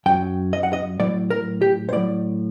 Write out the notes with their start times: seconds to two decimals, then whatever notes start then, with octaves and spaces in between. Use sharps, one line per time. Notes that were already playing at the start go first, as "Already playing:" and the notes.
0.06 F#2 F#3 G5
0.53 D#5
0.63 F#5
0.73 D#5
1.00 A2 F#3 D5
1.30 A#4
1.62 G4
1.89 C5
1.92 A2 F#3 D5